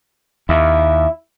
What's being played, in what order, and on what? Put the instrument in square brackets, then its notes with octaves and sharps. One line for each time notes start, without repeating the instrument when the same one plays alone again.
[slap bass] D#2 [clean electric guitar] E4